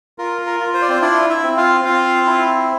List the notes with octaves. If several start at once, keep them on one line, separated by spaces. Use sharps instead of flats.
F4 A#4
A#4
F4
C5
D5
C4 C5
D4 E4 D5
E4 E5
C4
F4 F5
C4 F4 F5
E4